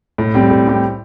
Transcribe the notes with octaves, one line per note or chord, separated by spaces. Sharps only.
A2
G3 C4 G4
A2
G3 C4 G4